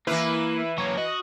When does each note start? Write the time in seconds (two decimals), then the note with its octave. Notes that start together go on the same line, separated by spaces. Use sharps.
0.07 E3 A#3 E4 B4
0.78 F#3 A#3 C#5
0.98 F#4 D#5